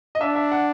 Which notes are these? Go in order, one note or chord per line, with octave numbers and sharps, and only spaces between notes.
D#5
D4 E5
E5
F#5